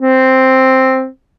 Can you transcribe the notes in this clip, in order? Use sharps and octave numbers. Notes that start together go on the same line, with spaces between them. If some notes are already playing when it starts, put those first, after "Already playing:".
C4